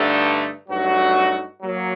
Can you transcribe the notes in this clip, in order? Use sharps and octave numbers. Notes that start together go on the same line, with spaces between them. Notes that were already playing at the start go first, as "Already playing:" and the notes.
Already playing: G2 D3 A3 D#4
G2 F#3 A3 D#4 F#4
F#3 A#3